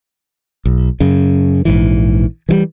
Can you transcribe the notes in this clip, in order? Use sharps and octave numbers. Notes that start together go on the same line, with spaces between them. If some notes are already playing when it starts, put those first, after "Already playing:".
B1
F#2 C#3
A#1 G#2 E3
E3 F3 G3